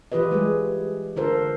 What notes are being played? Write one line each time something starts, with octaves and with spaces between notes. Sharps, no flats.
E3 F4 G4 B4 D#5
G3 G#3 G#4
D3 F4 A4 A#4 C5